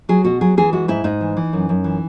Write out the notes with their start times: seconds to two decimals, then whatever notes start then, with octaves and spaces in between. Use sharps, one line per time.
0.09 F#3 G#4
0.24 B2 F#4
0.41 F#3 G#4
0.57 E3 G#4
0.73 G#3 F#4
0.88 G#2 E4
1.04 G#2 D#4
1.21 E3
1.37 E3
1.53 F#2
1.69 F#2
1.84 E3